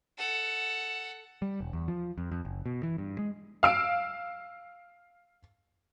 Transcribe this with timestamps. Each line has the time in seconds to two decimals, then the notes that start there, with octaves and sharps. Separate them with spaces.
0.18 A4 F#5
1.42 G3
1.61 E1
1.73 E2
1.88 F3
2.18 F2
2.32 F2
2.45 F#1
2.66 B2
2.83 E3
2.98 G2
3.19 G#3
3.63 F5 E6 D7